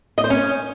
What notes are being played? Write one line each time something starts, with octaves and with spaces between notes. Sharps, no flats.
D#5
C5
C#4